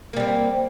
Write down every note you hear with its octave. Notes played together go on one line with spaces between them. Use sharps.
G3 A#3 C4